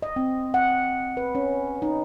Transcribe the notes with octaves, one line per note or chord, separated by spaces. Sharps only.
D#5
C4
F#5
B4
C#4
D#4